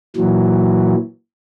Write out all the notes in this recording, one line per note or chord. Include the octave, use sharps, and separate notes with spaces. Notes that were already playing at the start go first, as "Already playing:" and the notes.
A#2 E3 F#3